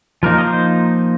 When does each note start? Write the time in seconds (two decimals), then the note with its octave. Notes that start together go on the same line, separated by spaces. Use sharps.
0.23 F3 A#3 D#4 A#4
0.38 D#5
0.44 C5